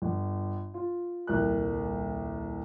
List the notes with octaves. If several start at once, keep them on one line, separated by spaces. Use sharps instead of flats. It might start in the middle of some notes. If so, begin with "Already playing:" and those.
G1
F4
D#1 C2 A#4 F#6